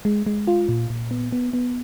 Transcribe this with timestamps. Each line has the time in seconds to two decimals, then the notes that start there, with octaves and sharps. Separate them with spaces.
0.05 G#3
0.26 G#3
0.47 F4
0.69 A#2
0.90 A#2
1.11 B3
1.32 B3
1.53 B3